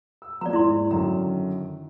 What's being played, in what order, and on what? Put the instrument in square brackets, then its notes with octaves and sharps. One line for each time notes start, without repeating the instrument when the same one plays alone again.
[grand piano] E6
[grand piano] F3 A#3 [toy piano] D5 A#5
[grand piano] G#2 [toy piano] E4 D5 C6
[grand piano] F#2 D3 D#3 [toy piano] A#5